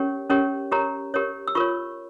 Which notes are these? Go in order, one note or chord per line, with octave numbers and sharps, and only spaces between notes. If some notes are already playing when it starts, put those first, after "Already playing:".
Already playing: C#4 G4 A#4 C#5
C#4 G4 A#4 C#5
G4 A#4 C#5 A#5
G4 A#4 C#5
E6
F4 A#4 C#5 C#6